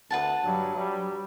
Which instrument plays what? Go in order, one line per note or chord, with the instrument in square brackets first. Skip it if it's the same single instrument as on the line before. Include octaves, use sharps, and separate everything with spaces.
[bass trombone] D2 [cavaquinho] B4 F#5 A5
[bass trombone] G2 [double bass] F#3
[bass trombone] G3